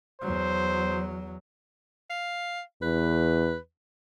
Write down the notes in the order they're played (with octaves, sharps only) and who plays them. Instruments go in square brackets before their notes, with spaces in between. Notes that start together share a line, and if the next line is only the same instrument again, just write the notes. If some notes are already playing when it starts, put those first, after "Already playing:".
[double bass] E2 F#3 [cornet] C5
[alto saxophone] F5
[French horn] E2 [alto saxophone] B4